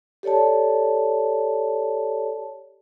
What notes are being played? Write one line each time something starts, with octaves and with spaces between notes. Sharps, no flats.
G4 A4 C#5 D5 A5